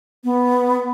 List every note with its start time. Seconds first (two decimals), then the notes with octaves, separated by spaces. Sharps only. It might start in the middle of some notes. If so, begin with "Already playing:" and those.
0.24 B3